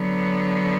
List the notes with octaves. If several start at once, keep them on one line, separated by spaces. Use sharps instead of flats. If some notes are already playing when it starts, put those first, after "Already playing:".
Already playing: D3 F#3 B3